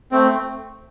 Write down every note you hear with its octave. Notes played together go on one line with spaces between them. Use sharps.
A3 C4